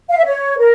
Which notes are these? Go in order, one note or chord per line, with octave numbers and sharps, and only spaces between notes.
F5
E5
C#5
A#4